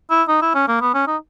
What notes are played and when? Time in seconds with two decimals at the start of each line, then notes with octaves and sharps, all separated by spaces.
0.10 E4
0.28 D#4
0.42 E4
0.55 C#4
0.68 A#3
0.81 B3
0.94 C#4
1.07 D#4